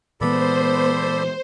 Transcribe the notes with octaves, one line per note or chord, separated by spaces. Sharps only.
A#2 E3 G#3 B3 A4 C5 D5 B5